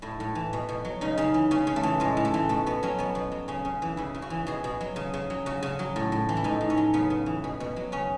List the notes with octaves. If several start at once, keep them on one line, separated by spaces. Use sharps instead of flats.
A2 E4
A2
E3
B2
B2
F#3
C#3 D#4
C#3 C#4
E3
C#3 C#4
C#3
A3
E3
A2 G#3
A2
A3
E3
B2 A3
B2 B3
F#3 C#4
B2 B3
B2
F#3
C#3 C#4
C#3
E3
C#3 E4
C#3
F#4
E3
B2 G#4
B2
F#3
C#3
C#3
F#3
C#3 F#4
C#3
F#3
A2
A2
E3
E4
A2 D#4
A2
C#4
F#3
C#3 B3
C#3
E3
B2
B2
F#3
C#3 C#4